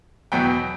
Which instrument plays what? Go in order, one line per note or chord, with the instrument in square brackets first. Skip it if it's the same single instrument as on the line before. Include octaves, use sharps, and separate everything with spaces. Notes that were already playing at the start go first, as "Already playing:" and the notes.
[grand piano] E2 B2 F#3 B3 G5